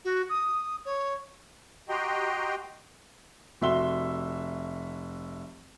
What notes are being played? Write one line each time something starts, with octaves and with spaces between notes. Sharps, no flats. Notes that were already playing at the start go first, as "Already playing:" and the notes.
F#4
D#6
C#5
F#4 G4 D#5 G5 A#5 C6
F1 F#4 E5 C6 G7